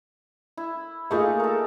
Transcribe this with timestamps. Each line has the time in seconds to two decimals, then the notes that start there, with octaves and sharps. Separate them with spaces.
0.57 E4
1.11 A3 A#3 D#4 F4 G#4 E5
1.40 A4 A#4